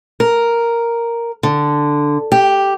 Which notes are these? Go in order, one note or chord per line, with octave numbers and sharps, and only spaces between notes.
A#4
D3
G4